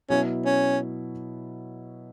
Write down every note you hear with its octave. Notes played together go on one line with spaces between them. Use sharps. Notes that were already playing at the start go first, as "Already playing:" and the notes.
B2 F#3 B3 C#4 E4
C#4